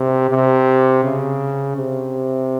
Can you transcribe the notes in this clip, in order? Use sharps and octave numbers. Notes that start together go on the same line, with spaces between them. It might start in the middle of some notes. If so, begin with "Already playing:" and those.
Already playing: C3
C3
C#3
C3